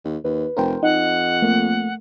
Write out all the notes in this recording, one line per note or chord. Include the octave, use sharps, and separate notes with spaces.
D#2
D#2 B4
F1 A#4 C5 G5
F2 D#4 D#5 F#5
A3 A#3